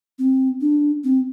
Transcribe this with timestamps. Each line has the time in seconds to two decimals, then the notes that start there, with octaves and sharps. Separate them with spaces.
0.19 C4
0.61 D4
1.04 C4